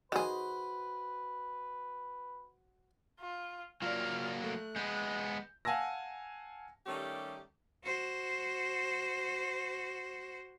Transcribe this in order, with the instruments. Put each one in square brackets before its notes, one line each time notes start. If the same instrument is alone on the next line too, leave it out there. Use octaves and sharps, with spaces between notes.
[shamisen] D#3 G#4 [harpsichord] F#4 C5 [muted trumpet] B4
[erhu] F4
[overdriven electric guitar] F#3 A#3 [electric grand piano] F4 D5 [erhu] F6
[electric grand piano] A3 [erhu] F#6
[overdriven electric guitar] G#3 B3 [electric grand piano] G6
[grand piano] F5 F#5 G#5 A5 E6 A#6
[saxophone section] D#3 G3 A3 C#4 G4
[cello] F#4 C5